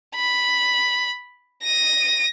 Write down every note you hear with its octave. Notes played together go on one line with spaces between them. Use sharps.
B5
A#6 D#7